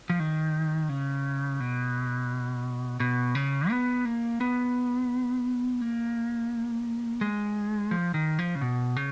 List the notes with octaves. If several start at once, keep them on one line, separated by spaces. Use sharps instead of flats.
F3
D#3
C#3
B2
B2
C#3
B3
A#3
B3
A#3
G#3
F3
D#3
F3
C#3
B2
C#3